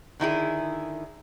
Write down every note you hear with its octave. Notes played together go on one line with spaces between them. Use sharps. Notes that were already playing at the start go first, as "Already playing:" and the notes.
D3 D#3 E4 G#4